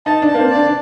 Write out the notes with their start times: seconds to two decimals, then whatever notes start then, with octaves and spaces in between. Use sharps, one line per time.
0.06 D#4 A5
0.22 D4
0.28 A5
0.34 A#3
0.39 C4
0.50 D5
0.55 D4
0.67 D4